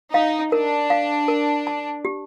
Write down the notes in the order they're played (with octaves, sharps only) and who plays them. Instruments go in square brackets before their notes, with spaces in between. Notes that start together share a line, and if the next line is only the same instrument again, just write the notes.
[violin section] D#4 [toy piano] F5
[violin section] D4 [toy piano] A#4
[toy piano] F5
A#4
A5
G4